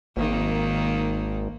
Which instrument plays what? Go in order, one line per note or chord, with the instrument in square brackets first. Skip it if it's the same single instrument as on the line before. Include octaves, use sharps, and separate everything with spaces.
[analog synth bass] G#1 [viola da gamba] D#3 A#3